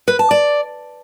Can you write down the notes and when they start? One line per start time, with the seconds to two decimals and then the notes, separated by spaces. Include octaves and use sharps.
0.08 B4
0.19 A5
0.31 D5